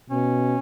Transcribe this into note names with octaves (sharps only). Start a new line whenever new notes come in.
B2 C#4